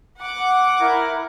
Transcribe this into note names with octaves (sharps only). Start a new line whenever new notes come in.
F#5 D6
E4 A#4